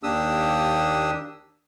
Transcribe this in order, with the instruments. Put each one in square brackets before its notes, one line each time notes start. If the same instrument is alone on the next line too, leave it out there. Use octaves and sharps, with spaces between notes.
[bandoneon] D#2 A#3 D4 G4 D#6 E6